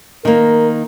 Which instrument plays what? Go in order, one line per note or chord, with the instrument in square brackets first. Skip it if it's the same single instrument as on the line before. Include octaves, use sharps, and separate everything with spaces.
[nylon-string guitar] D#3 A#3 [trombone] A#4